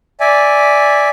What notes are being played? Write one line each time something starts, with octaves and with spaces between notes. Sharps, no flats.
D5 E5 G#5